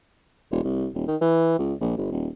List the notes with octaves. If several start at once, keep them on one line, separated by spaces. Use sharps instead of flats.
E1
C2
D#1
D#3
E3
C#2
A#1
G1
D#1